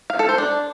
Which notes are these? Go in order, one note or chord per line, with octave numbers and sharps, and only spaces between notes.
F5
A4
C5
D4